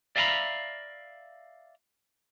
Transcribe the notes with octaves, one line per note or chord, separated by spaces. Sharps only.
D5 E5 F5 G#5 A#5 B5